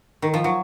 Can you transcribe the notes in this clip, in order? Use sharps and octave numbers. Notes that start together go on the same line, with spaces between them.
D#3
F3
F#3